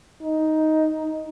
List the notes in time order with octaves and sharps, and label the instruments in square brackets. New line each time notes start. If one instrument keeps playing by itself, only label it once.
[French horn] D#4